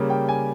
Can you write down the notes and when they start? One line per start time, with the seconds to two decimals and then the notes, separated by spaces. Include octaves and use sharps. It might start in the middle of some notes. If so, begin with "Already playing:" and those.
Already playing: C#3 G3 A#3
0.10 G5
0.29 G#5